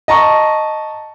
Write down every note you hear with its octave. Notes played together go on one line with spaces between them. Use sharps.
D#5 A5 A#5 C#6